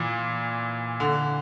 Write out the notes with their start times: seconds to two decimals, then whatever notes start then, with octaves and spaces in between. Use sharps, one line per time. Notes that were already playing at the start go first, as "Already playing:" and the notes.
Already playing: A#2 E3
1.00 D3